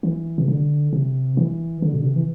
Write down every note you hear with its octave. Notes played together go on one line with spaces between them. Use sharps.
E3
C3
D3
C3
E3
D3
B2
D3
C3
E3